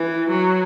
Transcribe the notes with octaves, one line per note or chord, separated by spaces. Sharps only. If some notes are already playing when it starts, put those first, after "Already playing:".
Already playing: E3
F#3